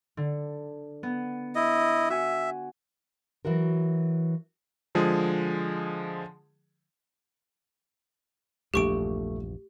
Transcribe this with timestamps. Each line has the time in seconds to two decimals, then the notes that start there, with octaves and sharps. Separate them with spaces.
0.17 D3
1.03 B3
1.55 E4 D#5
2.10 F#4 E5 G#5
3.45 E3 F#3 F#4 A#4
4.95 D3 F3 G#3 G#4
8.74 A#1 E2 G2 A3 G4 C#6 D7